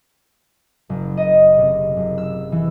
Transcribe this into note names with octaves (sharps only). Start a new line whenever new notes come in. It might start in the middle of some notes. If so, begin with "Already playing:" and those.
F#1
D#5
C3
F#1
E6
E3